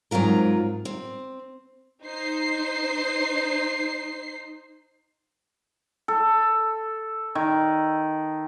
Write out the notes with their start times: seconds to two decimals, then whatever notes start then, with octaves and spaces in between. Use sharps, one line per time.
0.11 G#2 F#3 C4 F4 A#4
0.85 C4
2.03 D#4 C5 C7
6.08 A4
7.35 D#3